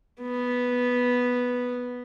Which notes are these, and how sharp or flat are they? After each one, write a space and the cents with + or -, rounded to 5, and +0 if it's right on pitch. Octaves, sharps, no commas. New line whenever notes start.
B3 -5